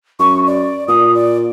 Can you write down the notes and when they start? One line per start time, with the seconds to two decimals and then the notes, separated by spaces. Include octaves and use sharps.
0.20 F#2 C#6
0.47 D5
0.88 A#2 D#6
1.15 D5